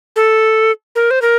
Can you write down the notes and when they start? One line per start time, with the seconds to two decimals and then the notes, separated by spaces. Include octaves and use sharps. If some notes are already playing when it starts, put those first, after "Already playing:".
0.16 A4
0.96 A#4
1.11 C5
1.22 A#4